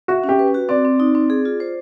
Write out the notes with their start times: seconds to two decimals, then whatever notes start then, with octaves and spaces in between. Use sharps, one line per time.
0.08 F#4 E5
0.24 C#4
0.29 G4
0.39 B4
0.54 F#4
0.69 C4 D5
0.85 C4
1.00 D#4
1.15 C4
1.30 G#4
1.45 F4
1.60 C5